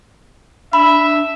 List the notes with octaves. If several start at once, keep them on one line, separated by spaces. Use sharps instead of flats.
D4 E5 B5